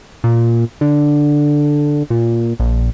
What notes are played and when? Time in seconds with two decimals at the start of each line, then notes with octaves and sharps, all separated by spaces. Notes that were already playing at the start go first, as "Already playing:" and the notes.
0.24 A#2
0.81 D3
2.10 A#2
2.60 A#1